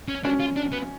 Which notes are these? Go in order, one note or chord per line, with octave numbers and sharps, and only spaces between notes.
C#4
C#4 D4
F4
D4
B3